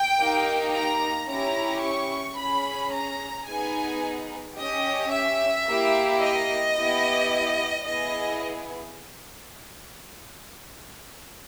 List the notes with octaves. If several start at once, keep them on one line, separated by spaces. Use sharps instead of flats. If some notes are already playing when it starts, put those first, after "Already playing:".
Already playing: G5
A#3 D#4 G4
A#5
C#4 E4 G4 A#5
C#6
C#4 G#4 B5
A#5
B3 D#4 G#4 G#5
C#4 G4 D#5
E5
A#3 E4 G4
D#5
B3 E4 G4
B3 E4 G#4 D#5